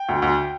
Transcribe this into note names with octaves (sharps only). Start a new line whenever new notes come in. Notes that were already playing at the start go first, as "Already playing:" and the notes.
Already playing: G5
D2
D2